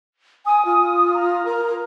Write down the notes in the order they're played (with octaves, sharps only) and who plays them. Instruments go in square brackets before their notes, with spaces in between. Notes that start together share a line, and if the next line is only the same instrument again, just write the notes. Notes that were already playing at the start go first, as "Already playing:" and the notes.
[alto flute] G#5 [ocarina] D#6
[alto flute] F4
[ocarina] A#5
[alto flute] A#4